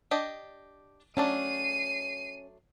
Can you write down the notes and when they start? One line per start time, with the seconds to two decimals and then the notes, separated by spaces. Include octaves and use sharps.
0.11 D4 G4 D#5
1.17 F#3 A3 C#4 D4 C7 D#7